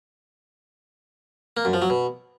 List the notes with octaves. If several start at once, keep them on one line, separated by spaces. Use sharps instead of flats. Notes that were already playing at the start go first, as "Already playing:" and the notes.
A#3
F#2
F3
F#3
B2